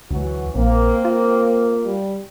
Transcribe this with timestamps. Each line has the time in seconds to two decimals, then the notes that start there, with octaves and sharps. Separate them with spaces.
0.11 D2 E3 F#3 F#4
0.55 A#1 A#3 C4
1.05 F4
1.85 G3